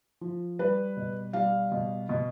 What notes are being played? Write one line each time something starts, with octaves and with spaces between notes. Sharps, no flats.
F3
G3 B4
B2
G3 F5
B2
B2